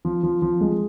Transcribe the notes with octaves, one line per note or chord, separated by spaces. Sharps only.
F3
F3
F3
G#3